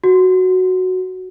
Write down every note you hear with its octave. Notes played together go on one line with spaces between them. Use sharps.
F#4